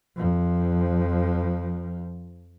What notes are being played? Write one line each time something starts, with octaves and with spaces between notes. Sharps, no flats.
F2 F3